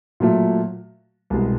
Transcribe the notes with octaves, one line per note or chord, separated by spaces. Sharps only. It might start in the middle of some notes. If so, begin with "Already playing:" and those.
A#2 F#3 A3
C2 B2 G#3